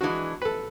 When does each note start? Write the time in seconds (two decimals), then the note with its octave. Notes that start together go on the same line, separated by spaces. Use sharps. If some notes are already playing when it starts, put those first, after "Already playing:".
0.01 E3 G#3 D4 F#4
0.42 B4
0.45 A4